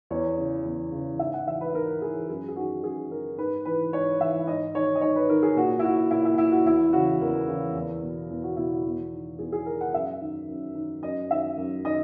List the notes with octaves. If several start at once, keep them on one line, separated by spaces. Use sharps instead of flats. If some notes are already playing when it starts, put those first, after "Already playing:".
E2 C#5
C#3 E3
E2
C#3 E3
G#2 E5
F#5
E3 E5
B4
G#2 A#4
E3 G#4
F#2 G#4
G#4
D#3 F#4
F#2 G#4
D#3 A#4
G#2 B4
E3 B4
G#2 C#5
E3 E5
G#2 D#5
D#3 C#5
D#5
G#2 C#5
B4
D#3 A#4
G#4
A#2 F#4
E4
F#4
A#2 E4
E4
E4
F#4
E2 E4
C#3 E3 F#4
E2 A#4
C#3 E3
E2
B2
E2
F#4
B2 E4
F#4
E2
D#3
E2 G#4
G#4
D#3 A#4
F#5
F#2 E5
D#3
F#2
D#3
F#2 D#5
D#3 E5
F#2
D#3 D#5